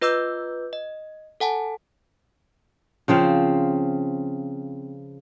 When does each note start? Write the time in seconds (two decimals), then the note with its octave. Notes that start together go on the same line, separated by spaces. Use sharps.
0.02 F4 B4 D#5 D6 E6 G6
0.73 D#5
1.40 A4 F#5 G#5 A5
3.08 C#3 F3 C4 F5